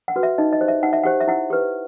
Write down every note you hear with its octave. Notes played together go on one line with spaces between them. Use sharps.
F#5
F#4 B4
E5
D#4 D#5
D#5
G4 C5
E5
D#4 F#5
E5
G4 C5 F#5
E5
E4 F#5
G4 B4